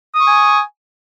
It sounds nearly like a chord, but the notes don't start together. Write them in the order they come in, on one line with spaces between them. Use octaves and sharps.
D#6 C#6 G#5